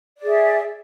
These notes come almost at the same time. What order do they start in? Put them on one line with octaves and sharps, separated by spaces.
D5 G#4 E5